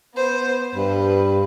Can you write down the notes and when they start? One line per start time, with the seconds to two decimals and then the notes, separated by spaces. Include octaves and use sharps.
0.15 B3 C5
0.75 G2 B4